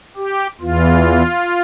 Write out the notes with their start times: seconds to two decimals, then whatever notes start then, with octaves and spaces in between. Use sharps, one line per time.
0.17 G4
0.61 E2 E3 F4